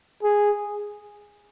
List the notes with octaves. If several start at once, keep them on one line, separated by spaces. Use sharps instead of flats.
G#4